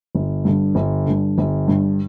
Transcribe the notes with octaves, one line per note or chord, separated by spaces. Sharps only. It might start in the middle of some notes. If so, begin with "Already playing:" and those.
G1
G2 D3
G1
G2 D3
G1
G2 D3